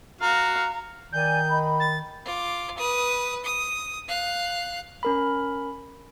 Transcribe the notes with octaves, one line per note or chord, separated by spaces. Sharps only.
F#4 F5 A#5
D#3 D5 G#5 G6
D#5 B5
A6
F4 D6
B4 D#6
D#6
F5 F#6
C#4 A#4 B5